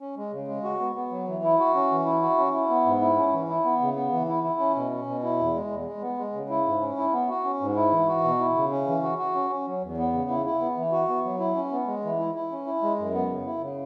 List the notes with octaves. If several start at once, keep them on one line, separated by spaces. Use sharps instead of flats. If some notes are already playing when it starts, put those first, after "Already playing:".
C#4
G#3
C#3
G#3
F#4
B3
B3
F#3
E3
E4
F#4
C#4
E3
E4
F#4
C#4
E4
B3
G#2
E4
C#4
E3
E4
B3
C#3
B3
E3
E4
E4
C#4
B2
C#4
B2
E4
E2
G#3
E2
G#3
B3
G#3
C#3
E4
G#2
C#4
E4
B3
F#4
C#4
G#2
E4
E3
F#4
B2
E4
C#3
C#4
E3
F#4
F#4
C#4
C#4
F#3
E2
B3
C#3
E4
E4
B3
E3
F#4
B3
F#3
E4
C#4
B3
G#3
E3
E4
E4
C#4
E4
G#3
F#2
B3
C#3
E4
C#3